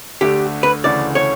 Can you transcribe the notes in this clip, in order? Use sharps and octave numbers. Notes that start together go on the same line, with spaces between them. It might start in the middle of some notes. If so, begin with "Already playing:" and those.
D2 D3 A3 D4 G4
B4
D2 C#3 E3 A3 D5
C#5